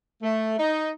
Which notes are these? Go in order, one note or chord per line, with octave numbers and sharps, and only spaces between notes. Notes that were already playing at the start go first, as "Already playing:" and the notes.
A3
D#4